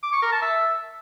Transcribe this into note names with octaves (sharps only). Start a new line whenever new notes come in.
D6
C#6
A#4
A5
E5